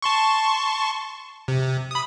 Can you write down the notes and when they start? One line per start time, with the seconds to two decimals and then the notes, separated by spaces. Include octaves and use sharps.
0.02 A5 C6 C#6
1.48 C3
1.91 B5 D#6